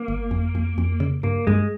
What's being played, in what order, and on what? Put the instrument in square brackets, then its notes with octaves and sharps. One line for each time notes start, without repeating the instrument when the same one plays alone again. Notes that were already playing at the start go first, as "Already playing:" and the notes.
Already playing: [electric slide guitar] A#3
[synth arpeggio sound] G1
F2
F2
F2
C#3
[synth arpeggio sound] G2 [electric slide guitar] A#3
[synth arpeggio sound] G2 [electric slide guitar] G#3